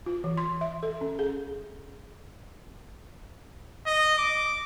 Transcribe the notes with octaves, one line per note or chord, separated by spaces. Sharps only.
F4
E3
C6
E5
A4
C#4
G#4
D#5
D6